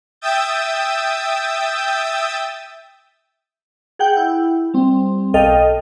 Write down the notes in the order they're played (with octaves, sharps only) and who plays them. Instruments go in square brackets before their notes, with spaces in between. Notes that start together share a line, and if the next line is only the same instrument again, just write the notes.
[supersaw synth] E5 G5 D#6 E6 G6 A6
[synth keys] G#4 F#5 G5 G6
E4
G3 C4
B1 A4 D#5 F5 G5